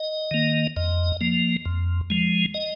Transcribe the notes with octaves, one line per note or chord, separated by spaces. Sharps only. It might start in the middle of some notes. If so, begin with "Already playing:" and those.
Already playing: D#5
D#3 A#3
F2 D#5
F3 A#3
F2
F3 G#3
D#5